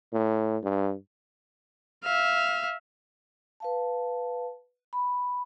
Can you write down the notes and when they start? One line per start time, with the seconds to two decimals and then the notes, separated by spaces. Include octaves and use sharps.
0.13 A2
0.63 G2
2.04 E5 F5
3.60 B4 F5 A5
4.93 B5